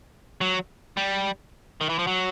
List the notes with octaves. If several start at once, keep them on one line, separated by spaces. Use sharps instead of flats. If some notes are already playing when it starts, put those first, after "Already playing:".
F#3
G3
D#3
E3
F3
F#3